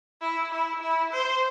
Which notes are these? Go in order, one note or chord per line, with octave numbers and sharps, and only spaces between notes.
E4
E4
E4
C5